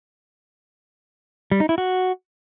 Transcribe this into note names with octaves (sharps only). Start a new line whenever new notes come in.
G3
D#4
E4
F#4